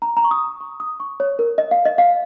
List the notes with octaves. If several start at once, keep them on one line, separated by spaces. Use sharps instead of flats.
A#5
A#5
C#6
D#6
C#6
D#6
C#6
C#5
A#4
D#5
F5
D#5
F5